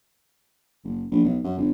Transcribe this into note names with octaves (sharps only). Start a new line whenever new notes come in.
F#1
A#1
B1
F#2
G1